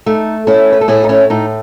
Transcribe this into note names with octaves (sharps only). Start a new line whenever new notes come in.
A3 D#4
A3 C#4 E4
B4
A4
A2 E4 G#4
D#4
C#4 E4
A2 D#4